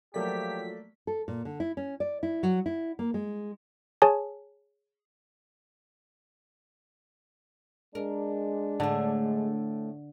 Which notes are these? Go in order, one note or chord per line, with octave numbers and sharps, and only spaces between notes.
F3 F#3 A3 A#3 G4 D5 B6
A4
A#2
D3
E4
C#4
D5
E4
F#3
E4
A#3
G#3
G#4 C#5 G#5 A5
G#3 D4 A#4
A2 D3 A3